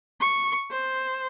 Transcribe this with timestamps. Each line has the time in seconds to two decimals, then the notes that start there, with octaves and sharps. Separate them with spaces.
0.20 C#6
0.70 C5